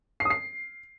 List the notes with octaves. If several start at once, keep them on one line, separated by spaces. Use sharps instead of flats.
C7
D#6
C7